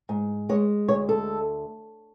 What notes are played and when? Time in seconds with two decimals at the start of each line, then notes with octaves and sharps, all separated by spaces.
0.09 G#2
0.49 G#3 C#5
0.88 D2 C#5
1.09 A4